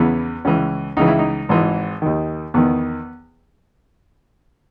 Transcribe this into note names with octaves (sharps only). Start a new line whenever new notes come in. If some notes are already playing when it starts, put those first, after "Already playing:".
Already playing: E2 C#3 E3 B3
C#2 C#3 E3 C#4
C#2 C#3 E3 D#4
E4
D#4
G#1 G#2 E3
D#2 D#3
E2 D#3 B3